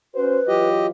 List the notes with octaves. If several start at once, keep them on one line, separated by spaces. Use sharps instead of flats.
C#4 F#4 B4 C5
E3 F#3 F4 G4 D#5